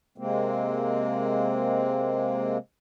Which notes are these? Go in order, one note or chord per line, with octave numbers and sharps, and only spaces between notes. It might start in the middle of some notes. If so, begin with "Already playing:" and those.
C3 G#3 A#3 C4